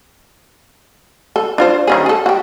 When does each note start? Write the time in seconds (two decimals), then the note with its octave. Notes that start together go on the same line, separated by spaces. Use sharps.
1.36 A4
1.58 D4 F4 C5
1.87 D#3 C#4 G#4
2.06 G#4 A4
2.26 F#4 G4